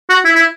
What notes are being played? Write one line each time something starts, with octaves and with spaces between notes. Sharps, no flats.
F#4
E4
E4